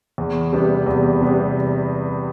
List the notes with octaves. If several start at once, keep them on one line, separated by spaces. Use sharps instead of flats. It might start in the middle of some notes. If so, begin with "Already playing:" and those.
E2
C3 G3 B3
E2
C3 G3 B3